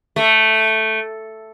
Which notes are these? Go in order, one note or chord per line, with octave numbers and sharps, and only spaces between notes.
A3